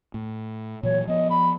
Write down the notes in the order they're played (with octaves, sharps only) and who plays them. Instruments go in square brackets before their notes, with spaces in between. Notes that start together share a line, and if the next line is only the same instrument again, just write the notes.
[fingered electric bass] A2
[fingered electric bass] A#2 E3 F#3 [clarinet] C#5
[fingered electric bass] F3 B3 [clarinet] D#5
[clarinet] B5